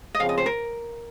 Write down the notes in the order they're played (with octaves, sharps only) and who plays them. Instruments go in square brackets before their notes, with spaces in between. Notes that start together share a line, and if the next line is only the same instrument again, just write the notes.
[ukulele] D#5
[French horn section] C#3 F3 C4 [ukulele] F5
[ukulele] D#5
C5
A#4